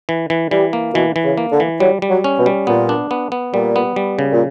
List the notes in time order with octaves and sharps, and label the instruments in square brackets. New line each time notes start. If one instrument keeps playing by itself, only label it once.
[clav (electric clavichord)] E3
E3
[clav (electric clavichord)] E3 [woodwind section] G3
[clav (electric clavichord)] A#3
[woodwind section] B2 [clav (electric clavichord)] E3
[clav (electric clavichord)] E3
[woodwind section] C#3
[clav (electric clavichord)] A#3
[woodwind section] D3
[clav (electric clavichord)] E3
[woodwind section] F#3 [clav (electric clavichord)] G3
[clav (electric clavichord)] G3
[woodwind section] F#3
[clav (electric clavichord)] C#4
[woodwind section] B2
[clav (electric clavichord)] G3
[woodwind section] A#2 [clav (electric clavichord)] B3
[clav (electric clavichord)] D4
B3
B3
[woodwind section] A#2 [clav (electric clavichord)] G3
[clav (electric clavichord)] B3
G3
C#3
[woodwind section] A#2